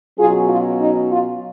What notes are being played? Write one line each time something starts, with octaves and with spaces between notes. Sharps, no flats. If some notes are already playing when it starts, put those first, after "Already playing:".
B2 F#3 C#4 F4 G#4
F4
D#4
F4